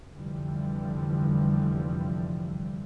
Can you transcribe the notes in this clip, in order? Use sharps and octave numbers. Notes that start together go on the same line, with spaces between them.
F1 D3 E3 F3 G3